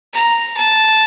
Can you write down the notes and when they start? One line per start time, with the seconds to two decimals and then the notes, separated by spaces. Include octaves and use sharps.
0.14 A#5
0.57 A5